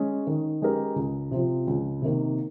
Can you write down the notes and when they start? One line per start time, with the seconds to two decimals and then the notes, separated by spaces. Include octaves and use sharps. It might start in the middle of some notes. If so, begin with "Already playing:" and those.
Already playing: G#3 C#4
0.27 D#3
0.62 G#3 C#4 G4 A#4
0.96 C#2
1.31 C3 F3 C4
1.67 C#2
2.02 C3 D#3 A#3